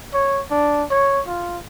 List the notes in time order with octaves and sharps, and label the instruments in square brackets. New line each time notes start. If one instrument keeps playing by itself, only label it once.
[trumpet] C#5
D4
C#5
F4